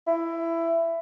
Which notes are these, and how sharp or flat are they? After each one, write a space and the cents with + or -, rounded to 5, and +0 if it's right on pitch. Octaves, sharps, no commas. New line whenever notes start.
E4 +15